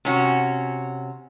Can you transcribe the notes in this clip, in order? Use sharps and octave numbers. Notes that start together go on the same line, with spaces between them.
C3 C#4 F#4